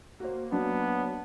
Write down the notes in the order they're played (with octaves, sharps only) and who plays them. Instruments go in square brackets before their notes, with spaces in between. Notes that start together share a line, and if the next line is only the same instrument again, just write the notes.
[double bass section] A#3 [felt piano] F#4 C5
[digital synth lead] F#3 [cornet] B3 [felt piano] D4